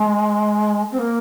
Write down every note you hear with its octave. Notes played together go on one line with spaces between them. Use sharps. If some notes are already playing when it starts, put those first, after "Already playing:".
Already playing: G#3
C4
A#3